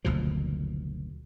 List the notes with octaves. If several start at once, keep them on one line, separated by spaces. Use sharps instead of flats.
F#1 D2 B2 F3